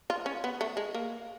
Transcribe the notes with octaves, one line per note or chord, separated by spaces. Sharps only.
F4
C#4
B3
A3
G#3
A#3